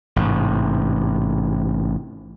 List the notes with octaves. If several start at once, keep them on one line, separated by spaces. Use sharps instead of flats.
A1 G#2 C3